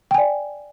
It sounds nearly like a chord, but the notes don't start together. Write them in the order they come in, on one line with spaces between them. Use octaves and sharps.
G5 G#5 D5